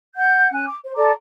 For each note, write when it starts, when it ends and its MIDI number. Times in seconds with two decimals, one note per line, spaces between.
0.15 0.49 78
0.15 0.49 91
0.51 0.64 61
0.51 0.64 80
0.51 0.64 90
0.67 0.76 86
0.83 0.91 72
0.96 1.11 69
0.96 1.11 74
0.96 1.11 82
0.96 1.11 86